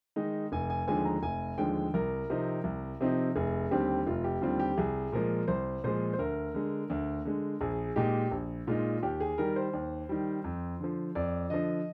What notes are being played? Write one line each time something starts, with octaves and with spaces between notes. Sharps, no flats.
D#3 G#3 D#4
F1 G#5
G#5
D#2 D3 F3 G#3 G#5
A#5
F1 G#5
D#2 D3 F3 G#3 G5
C2 A#4
C3 F3 C4 D#4
C2
C3 F3 C4 D#4
F1 G#4
D#2 D3 G3 C4 G4
F1 F4
G4
D#2 D3 G3 C4 F4
G4
C2 G#4
A#2 F3 G#3 A#4
C2 C5
A#2 F3 G#3 C5
C5
D2 A#4
D3 G#3
D2
D3 G#3
A#1 G#4
A#2 G#3 D#4 G4
A#1
A#2 G#3 D#4 F4
D#2 G4
G#4
D#3 G3 A#4
C5
D#2
D#3 G3
F2
D3 F3
F2 D5
D3 F3 D#5